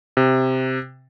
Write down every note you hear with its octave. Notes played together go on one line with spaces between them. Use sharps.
C3